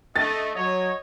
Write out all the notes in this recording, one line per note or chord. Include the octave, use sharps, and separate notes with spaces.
A3 D#5 A6
F#3 C#5 D#5